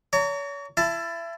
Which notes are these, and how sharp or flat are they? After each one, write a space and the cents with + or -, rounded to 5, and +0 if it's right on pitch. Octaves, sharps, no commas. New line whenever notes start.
C#5 +35 A#5 -30
E4 +30 A5 +0